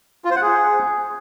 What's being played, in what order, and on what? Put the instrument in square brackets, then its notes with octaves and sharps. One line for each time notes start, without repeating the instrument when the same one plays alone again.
[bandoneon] F4
C5
F#5
G#4